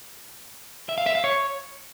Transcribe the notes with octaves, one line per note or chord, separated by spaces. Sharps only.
E5
F5
E5
F5
C#5